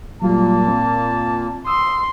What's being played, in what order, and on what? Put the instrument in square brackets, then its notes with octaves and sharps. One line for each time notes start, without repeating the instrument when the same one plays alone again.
[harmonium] A#2 A#3 [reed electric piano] F#3 G3 F4 [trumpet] A5
[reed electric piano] C4
[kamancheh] C6 [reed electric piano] D#6 E6